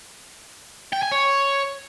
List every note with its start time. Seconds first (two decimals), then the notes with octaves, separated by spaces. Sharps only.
0.93 G5
1.02 G#5
1.11 C#5